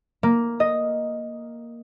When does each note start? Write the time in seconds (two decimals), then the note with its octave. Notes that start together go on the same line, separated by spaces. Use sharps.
0.23 A#3
0.60 D#5